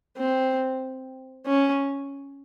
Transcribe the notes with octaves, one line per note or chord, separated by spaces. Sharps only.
C4
C#4